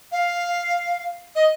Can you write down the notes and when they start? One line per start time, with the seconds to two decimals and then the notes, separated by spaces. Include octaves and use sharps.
0.12 F5
1.35 D#5